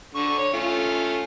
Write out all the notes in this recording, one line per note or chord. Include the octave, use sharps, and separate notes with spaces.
D3 C#6
C#5
A3 C#4 F4